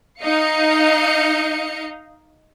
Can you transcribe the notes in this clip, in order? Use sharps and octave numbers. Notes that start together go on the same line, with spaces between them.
D#4 D#5 F5 C#7